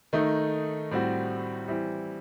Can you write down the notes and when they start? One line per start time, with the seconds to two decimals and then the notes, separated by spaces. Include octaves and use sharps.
0.13 D#3 A3 D#4
0.91 A2 G3 C4 F#4
1.68 E3 G3 C4 E4